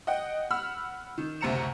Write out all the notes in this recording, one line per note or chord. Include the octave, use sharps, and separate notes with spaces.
D#5 F#5 G5
F#5 B5 E6 F6
D#3
F#1 D2 C3 A#5 C#7 E7